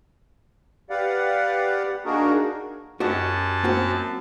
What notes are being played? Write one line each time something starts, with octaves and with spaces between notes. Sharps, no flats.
G4 B4 D5 F5 F#5
A#3 D4 D#4 F#4 G#4 A#4
F#2 F#4 G4 D#5 A5
A#3 C4 F#4